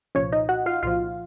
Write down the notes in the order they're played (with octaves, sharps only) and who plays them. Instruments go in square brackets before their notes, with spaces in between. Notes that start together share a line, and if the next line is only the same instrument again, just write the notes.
[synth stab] C2 A#2 F3 C#4 C#5
D#4 D#5
F#4 F#5
F4 F5
C2 A#2 F3 F4 F5